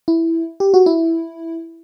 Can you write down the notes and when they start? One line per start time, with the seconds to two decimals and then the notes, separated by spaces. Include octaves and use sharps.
0.08 E4
0.60 G4
0.74 F#4
0.86 E4